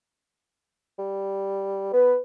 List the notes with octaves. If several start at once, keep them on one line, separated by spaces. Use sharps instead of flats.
G3
B3 B4